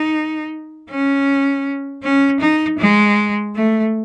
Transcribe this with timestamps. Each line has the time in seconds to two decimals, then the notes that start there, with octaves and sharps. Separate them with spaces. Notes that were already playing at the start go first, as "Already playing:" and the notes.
Already playing: D#4
0.89 C#4
2.03 C#4
2.40 D#4
2.79 G#3
3.55 A3